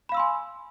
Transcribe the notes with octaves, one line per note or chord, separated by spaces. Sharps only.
F5 G#5 B5 C6 E6